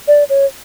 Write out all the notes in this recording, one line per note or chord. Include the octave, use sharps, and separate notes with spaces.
D5
C#5